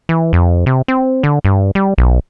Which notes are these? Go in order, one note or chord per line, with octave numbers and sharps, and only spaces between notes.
E3
F2
C3
C4
D3
G2
G3
B1